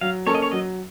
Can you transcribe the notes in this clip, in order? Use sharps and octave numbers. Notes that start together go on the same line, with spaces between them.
F#3 F5
A#3 C#4 A4 C#5
D#5
C#5
F#3 D#5